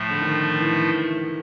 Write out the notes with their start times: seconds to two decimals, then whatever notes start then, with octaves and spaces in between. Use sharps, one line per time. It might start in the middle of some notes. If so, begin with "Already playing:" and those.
Already playing: A2 F3 A3
0.11 D3
0.21 D#3
0.59 E3